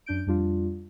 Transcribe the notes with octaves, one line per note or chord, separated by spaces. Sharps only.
F#2 D4 G6 D7
F2 G3 D4 F4